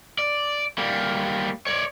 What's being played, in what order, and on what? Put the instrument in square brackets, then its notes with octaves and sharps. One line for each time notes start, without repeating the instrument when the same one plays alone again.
[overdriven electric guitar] D5
G3 A#3
C#5 D5